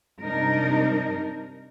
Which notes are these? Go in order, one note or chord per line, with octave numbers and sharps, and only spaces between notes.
C3 G3 D4 D#4 A#4